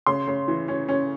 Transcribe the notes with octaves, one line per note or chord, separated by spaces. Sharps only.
C#3 C6
C#3
E3
C#4
C#4